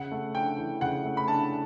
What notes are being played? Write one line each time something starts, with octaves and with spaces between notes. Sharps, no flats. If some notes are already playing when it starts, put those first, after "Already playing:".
Already playing: C#3 F#5
A3
D4 G5
E3
C#3 F#5
A3
B5
D4 A5